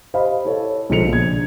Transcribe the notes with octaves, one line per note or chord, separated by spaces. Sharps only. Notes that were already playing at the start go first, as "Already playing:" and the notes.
G4 C5 D#5 F5 B5
E4 A4 C#5
B1 C#3 F3 A4 C#7 F7
A#1 G#6